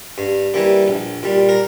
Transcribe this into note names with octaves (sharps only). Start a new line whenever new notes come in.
G2
E3 G3 A#3
A#1
A#2 G3
A#4